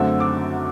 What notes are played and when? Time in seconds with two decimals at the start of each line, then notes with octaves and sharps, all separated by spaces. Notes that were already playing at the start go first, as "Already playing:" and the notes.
Already playing: F#2 D3 F#3 A3 C4 E6
0.20 D6